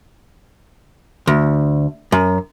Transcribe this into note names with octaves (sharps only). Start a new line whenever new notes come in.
D2
F#2